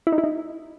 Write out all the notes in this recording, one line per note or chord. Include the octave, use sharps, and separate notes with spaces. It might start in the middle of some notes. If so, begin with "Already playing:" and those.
E4
D#4
E4
D#4